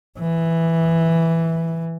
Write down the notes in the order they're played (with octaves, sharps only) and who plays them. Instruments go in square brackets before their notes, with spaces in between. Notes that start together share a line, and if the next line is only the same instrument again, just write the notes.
[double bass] E3